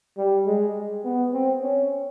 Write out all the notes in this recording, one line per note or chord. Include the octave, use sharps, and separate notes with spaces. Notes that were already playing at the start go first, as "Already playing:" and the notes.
G3
G#3
B3
C4
C#4